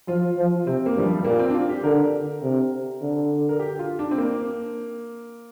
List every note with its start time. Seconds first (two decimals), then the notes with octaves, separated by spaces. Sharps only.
0.08 F3 F4
0.38 F3
0.67 C3 C4
0.86 A#3
0.96 G2 F3
1.06 G3
1.25 A#2 A#3
1.39 C4
1.49 D4
1.54 F4
1.69 G4
1.83 D3 A#4
2.43 C3
3.01 D3
3.49 A#4
3.59 G4
3.79 F4
3.99 D4
4.11 C4
4.18 A#3